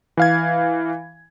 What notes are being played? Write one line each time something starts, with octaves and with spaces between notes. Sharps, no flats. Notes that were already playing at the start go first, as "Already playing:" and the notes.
E3 F5 G#6